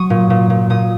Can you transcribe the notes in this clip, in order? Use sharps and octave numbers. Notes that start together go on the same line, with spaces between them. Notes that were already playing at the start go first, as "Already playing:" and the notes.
Already playing: F#3 C#6 D#6
A#2
A#2
A#2
A#2 D#6